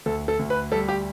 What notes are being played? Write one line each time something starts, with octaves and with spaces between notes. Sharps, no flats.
D2 A4
A4
D2
B4
G3 A4
G4